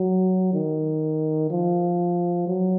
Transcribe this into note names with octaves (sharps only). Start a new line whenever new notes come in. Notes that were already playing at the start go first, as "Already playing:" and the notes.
Already playing: F#3
D#3
F3
F#3